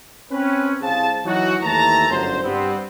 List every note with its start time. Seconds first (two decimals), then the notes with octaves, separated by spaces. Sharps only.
0.32 C4 C#4 B4
0.82 C2 C4 G#4 F5 A5
1.26 E3 F#3 D#4 F#4
1.63 D#2 E3 A3 A4 A5 A#5
2.09 G1 C2 F#2 C#3 C5
2.43 G2 G3 B3 C4